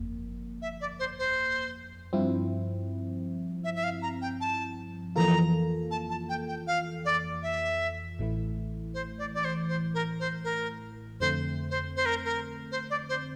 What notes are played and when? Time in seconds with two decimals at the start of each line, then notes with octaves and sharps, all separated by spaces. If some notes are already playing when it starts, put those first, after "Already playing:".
Already playing: G1 F2 A#3
0.62 E5
0.81 D5
0.99 C5
1.19 C5
2.13 G2 F3 C4 E4
3.64 E5
3.76 E5
3.84 F5
4.02 A#5
4.22 G5
4.41 A5
5.16 F2 E3 A#3 F4 A4 A#5
5.91 A5
6.10 A5
6.29 G5
6.49 G5
6.67 F5
7.05 D5
7.43 E5
8.19 A1 A2 E3 A3 E4
8.94 C5
9.19 D5
9.34 D5
9.45 C5
9.69 C5
9.94 A#4
10.20 C5
10.44 A#4
11.20 F2 D3 A3 C4 C5
11.71 C5
11.97 C5
12.06 A#4
12.25 A#4
12.72 C5
12.90 D5
13.09 C5